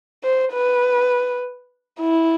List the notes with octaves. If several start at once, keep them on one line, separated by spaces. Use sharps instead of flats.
C5
B4
E4